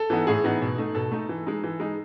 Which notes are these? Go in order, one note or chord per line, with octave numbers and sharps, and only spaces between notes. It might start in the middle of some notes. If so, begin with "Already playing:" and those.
Already playing: A4
E3 B3 D#4
A2 G#4
E3 B3 D#4
B2
A3 D#4
B2 A4
A3 D#4
E3
G#3 D#4
E3
G#3 D#4